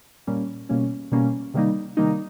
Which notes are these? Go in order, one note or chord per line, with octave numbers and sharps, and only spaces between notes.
A#2 G3 A#3 C#4
B2 G3 A#3 C#4
B2 G3 A#3 C#4
C3 D#3 G3 A#3 D#4
C3 D#3 G3 A#3 D#4